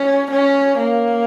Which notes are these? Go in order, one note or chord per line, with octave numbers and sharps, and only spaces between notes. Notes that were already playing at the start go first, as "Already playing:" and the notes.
Already playing: C#4
C#4
A#3